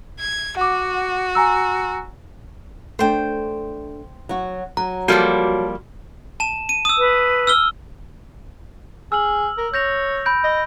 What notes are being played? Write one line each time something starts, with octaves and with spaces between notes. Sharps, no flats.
G#6
F#4 F#5 D6
G#5 A#5 E6
A3 D4 C5 G5
F#3 F#4
F#3 A#5
F3 G3 A#3 F#4 A4 D6
A5 E7
D#7
D#6 E6
B4
E6 F6 G7
G#4 E6 F6 F#7
A#4
C#5 G6 A#6 F7
B5 G6 D7
D#5